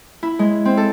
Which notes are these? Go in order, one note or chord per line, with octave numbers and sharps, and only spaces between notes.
E4
G#3
C4
A4